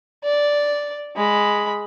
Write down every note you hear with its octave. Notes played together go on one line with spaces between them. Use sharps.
D5
G#3 B5